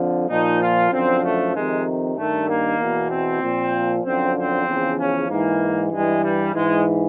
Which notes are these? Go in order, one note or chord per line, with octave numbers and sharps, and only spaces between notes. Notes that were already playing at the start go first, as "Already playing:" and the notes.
Already playing: F2 D3 F3
A#2 F3 D#4
F4
F#2 D3 F3 C4
A3
F2 C3 D#3 G#3
G2 D#3 A3
A#3
E2 B2
C4
A#2 F3
F#2 D3 F3 C4
C4
E2 C#3 F3
C#4
G#2 E3 A#3
G2 E3 G#3
G3
G#2 E3 G#3